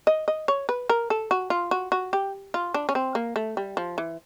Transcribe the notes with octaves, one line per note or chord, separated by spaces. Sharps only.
D#5
D#5
C#5
B4
A#4
A4
F#4
F4
F#4
F#4
G4
F4
D4
C#4
C4
A#3
A3
G3
F3
E3